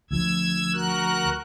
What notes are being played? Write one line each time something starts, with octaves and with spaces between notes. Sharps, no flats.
D2 F3 E6 G#6
F#4 A#4 F#6